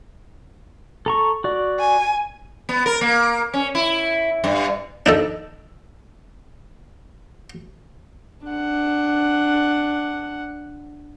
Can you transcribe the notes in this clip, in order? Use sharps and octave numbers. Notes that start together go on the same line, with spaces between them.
A4 A#5 C#6
F#4 D5
G#5
B3
A#4
A#3
C#4
E4
G2
D4 D#4 A4
D4 F#5